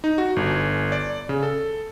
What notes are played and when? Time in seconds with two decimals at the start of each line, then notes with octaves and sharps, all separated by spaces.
0.04 D#4
0.18 F#4
0.36 G1
0.92 D5
1.29 C#3
1.43 A4